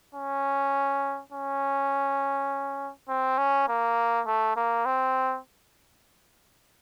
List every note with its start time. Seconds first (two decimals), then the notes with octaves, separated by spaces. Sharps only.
0.15 C#4
1.32 C#4
3.09 C4
3.38 C#4
3.68 A#3
4.27 A3
4.56 A#3
4.85 C4